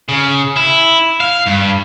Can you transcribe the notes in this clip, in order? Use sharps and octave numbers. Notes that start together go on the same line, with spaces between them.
C#3
E4
F5
G2